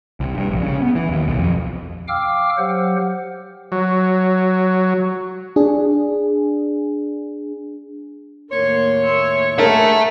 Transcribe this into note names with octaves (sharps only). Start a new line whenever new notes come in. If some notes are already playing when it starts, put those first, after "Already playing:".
C2
G2
A#1
C#3
B3
E3
D#2
B1
F2
F5 G5 D6 E6 F6
F#3 G4 C5 F#5
F#3
D4 G#4
D#2 A2 A#3 C#5 C6
E5 C6
G#4 A#4 E5 F#5 A5